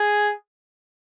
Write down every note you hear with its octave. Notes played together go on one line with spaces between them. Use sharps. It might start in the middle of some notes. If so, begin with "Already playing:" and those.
Already playing: G#4